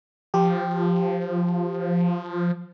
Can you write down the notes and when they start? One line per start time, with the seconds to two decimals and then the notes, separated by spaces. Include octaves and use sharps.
0.34 F3 G4